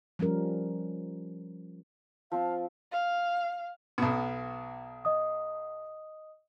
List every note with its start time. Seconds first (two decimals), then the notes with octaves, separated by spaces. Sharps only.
0.19 F3 G3 C#4 A#4
2.32 F3 C4 F5 A5
2.91 F5
3.98 B1 B2
5.05 D#5 D#6